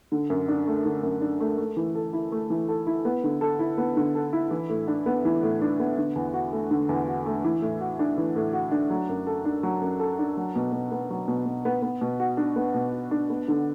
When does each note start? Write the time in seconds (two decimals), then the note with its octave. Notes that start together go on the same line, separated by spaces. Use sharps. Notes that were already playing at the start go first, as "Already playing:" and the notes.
0.12 D3
0.30 F#2
0.48 D4
0.67 A3
0.85 D3
1.03 F#2
1.21 D4
1.40 A3
1.58 A3
1.77 E3
1.95 A4
2.13 E4
2.32 A3
2.50 E3
2.68 A4
2.87 E4
3.05 B3
3.24 D3
3.41 A4
3.59 E4
3.78 B3
3.97 D3
4.15 A4
4.33 E4
4.51 E3
4.69 A2
4.88 D4
5.06 B3
5.25 E3
5.43 A2
5.62 D4
5.80 B3
5.97 D3
6.16 E2
6.33 F#4
6.52 A3
6.71 D3
6.89 E2
7.07 F#4
7.26 A3
7.44 E3
7.62 A2
7.81 F#4
7.99 D4
8.18 E3
8.36 A2
8.53 F#4
8.71 D4
8.90 F#3
9.09 F#2
9.27 A4
9.45 D4
9.63 F#3
9.81 F#2
9.99 A4
10.19 D4
10.37 F#3
10.55 B2
10.73 B2
10.92 B3
11.10 F#3
11.28 B2
11.46 B2
11.65 B3
11.82 B3
12.01 B2
12.20 F#4
12.37 D4
12.56 B3
12.74 B2
12.93 F#4
13.11 D4
13.30 B3
13.48 D3